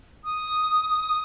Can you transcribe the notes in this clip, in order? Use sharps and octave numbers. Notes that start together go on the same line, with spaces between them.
D#6